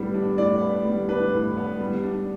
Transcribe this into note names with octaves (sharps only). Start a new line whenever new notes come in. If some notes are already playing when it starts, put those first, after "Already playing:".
Already playing: A2 G3 B3 D4
D4
A2 D5
B3
G3
D4 B4
A2
B3
G3
D4